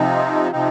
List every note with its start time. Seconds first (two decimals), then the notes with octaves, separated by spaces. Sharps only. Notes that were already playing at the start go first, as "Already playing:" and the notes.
Already playing: C3 F3 C4 D#4
0.52 C3 F3 C4 D#4